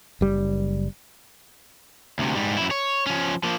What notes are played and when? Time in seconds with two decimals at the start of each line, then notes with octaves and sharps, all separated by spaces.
0.21 F#1 G3
2.19 D2 C3
2.35 G#2 G3
2.57 F#2 E4
2.71 C#5
3.07 F3 C#4
3.43 F3 A#3